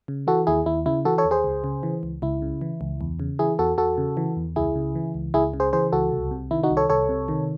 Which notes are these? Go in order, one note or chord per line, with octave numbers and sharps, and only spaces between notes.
C#3
E3 F#4 A4
D#2 E4 G#4
D#2 E4
C#3 E4
E3 F#4 A4
A4 C#5
D#2
G#4 C5
C#2
C#3
E3
C#2
C#2 E4
C#3
E3
C#2
E2
C#3
E3 E4 G#4
E2 F#4 A4
E2 F#4 A4
C#3
E3
E2
C#2 E4 G#4
C#3
E3
C#2
C#2 E4 G#4
C#3
G#4 C5
E3 G#4 C5
C#2 F#4 A4
C2
C3
D#3 E4
D#4 F#4
C2
A4 C#5
C2 A4 C#5
C3
D#3